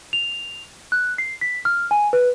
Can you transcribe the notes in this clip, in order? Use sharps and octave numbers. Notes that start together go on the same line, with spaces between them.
F7
F#6
C7
B6
F6
G#5
B4